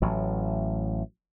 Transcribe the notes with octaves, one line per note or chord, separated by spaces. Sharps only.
A1 A2 F#3